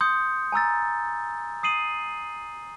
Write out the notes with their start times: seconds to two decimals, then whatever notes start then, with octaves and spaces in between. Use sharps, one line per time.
0.01 C6 D#6 G6 C#7
0.52 G#5 A#5 E6 A6
1.63 D#6 C7 D#7 F#7